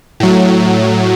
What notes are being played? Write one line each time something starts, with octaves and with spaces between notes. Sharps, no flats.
A2 F#3